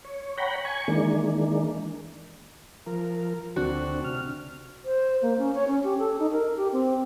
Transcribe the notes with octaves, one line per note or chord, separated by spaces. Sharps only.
C#5
C#5 F#5 G5 A#5 B5
G#5 C#6
D#3 E3 G#3 A#3 D4
F3 A#4
D2 C4 D4 F#4
C3 F6
C5
A#3
C#4
C#5
C#4
G4
A4
D#4
A#4
G4
C4